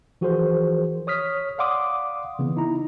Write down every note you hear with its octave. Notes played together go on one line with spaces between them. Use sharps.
E3 F3 F#4 G#4 A#4 C5
C#5 D#6 F6 B6
D5 F5 F#5 C6 D6 D#6
C#3 E3 B3
D#4 E4 A#5